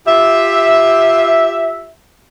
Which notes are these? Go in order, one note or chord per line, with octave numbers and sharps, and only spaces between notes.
F4 G4 E5